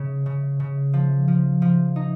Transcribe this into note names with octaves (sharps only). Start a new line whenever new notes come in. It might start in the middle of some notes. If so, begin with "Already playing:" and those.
Already playing: C#3
C#3
C#3
F3
F3
F3
D#4